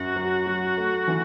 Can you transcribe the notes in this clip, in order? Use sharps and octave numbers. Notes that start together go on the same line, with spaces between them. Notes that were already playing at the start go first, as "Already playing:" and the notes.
Already playing: F#2 F#4
F#3
F#3
A3
E3